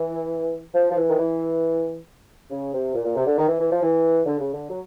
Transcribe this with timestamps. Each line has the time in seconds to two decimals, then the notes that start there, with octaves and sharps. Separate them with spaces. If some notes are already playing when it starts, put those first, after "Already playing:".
Already playing: E3
0.74 F3
0.91 F3
0.97 E3
1.09 D#3
1.18 E3
2.50 C#3
2.72 C3
2.94 A#2
3.05 A#2
3.15 C3
3.27 D3
3.38 D#3
3.49 E3
3.60 E3
3.71 F3
3.82 E3
4.26 D3
4.39 C#3
4.54 D3
4.70 F#3